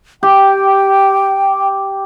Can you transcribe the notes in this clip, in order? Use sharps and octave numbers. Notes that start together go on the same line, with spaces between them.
G4 G5